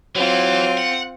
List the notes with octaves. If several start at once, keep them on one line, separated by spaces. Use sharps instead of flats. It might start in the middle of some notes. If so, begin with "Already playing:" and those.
E3 F#3 C4 F4
F#5